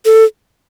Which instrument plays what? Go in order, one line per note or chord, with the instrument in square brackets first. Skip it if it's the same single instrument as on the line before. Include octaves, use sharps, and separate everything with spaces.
[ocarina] A4